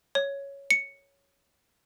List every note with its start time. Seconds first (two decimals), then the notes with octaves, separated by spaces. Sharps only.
0.15 C#5
0.70 C#7